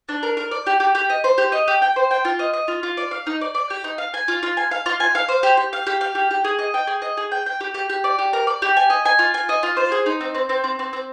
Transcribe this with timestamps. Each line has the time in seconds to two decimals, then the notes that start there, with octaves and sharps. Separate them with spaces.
0.09 D4
0.23 A#4
0.37 A#4
0.51 D5
0.67 G4
0.80 G4
0.95 G4
1.10 D#5
1.24 C5
1.38 G4
1.52 D#5
1.68 G4
1.82 G5
1.96 C5
2.11 G5
2.25 F4
2.39 D#5
2.53 D#5
2.68 F4
2.83 F4
2.97 D5
3.11 F5
3.27 D#4
3.41 D5
3.55 D5
3.70 G4
3.84 D#4
3.98 F5
4.14 G#5
4.28 F4
4.43 F4
4.57 G#5
4.71 F5
4.86 F4
5.00 G#5
5.15 F5
5.29 C5
5.43 G4
5.57 G4
5.73 F5
5.87 G4
6.01 F5
6.15 G4
6.31 G4
6.45 G#4
6.59 D#5
6.74 G5
6.87 G#4
7.02 D#5
7.17 G#4
7.32 G5
7.46 G5
7.60 G4
7.74 G4
7.89 G4
8.04 D5
8.19 G4
8.33 A#4
8.47 D5
8.62 G4
8.77 G#5
8.90 D#5
9.05 G#5
9.19 F4
9.34 G#5
9.49 D#5
9.63 F4
9.77 C5
9.92 G#4
10.06 D#4
10.21 C4
10.35 C4
10.49 C4
10.64 C4
10.79 C4
10.93 C4